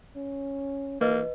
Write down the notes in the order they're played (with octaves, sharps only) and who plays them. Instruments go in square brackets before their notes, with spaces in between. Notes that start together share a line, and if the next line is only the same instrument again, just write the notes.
[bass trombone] C#4
[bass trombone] E3 [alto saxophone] A#3 [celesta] B4 D#5